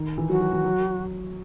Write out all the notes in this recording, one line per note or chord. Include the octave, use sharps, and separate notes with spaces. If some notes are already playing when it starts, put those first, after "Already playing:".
Already playing: D#3
E3
F#3 F#4
F#3
E3
F#3